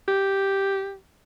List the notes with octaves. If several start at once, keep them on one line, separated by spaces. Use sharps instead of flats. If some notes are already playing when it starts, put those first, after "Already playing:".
G4